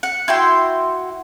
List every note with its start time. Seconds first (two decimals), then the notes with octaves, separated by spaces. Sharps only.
0.03 F#5
0.28 E4 F#4 G5 C6